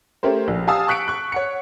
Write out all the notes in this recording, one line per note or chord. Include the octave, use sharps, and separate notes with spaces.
A3 C#4 G4 A#4 C5
A#1
G4 F5 G#5 A5 D#6 E6
C#6 F#6 B6 C#7 D7
C#6 F#6
C#5 F#5 C#7